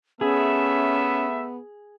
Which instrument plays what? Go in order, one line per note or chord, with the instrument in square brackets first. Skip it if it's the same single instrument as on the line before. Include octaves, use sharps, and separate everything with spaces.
[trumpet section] A3 E5 [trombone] B3 [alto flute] C#4 [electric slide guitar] G#4